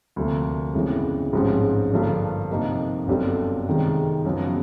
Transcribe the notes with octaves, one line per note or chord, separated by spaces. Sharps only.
D2 C3 F3 A#3
G1 F2 C#3 E3 G#3
A1 G#2 F3 G#3 C4
G2 D3 F3 A#3 D4
F2 C3 F3 A#3 D#4
G1 F#2 D3 G3 C4
F2 C3 D#3 G#3
F#2 C#3 F3 G#3 B3